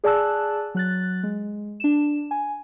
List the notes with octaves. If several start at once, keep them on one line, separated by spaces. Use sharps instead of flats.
G#4 D5 G#5 A5 E6 F#6
F#3 F#6 A6
G#3
D4 E7
G#5